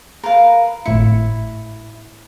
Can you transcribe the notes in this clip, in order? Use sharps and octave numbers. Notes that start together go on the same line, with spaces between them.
A#4 B4 F5
G#1 A2 E4 C#7